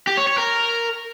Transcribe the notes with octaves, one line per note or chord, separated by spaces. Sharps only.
G4
C#5
C#5
A#4